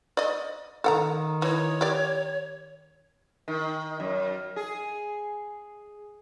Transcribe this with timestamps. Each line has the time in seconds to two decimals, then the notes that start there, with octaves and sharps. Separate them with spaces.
0.17 D5 D#5
0.84 D#3 A4 F#5 A#5
1.42 E3 C#5
1.81 G4 D5
3.48 D#3
4.00 F#2
4.56 G#4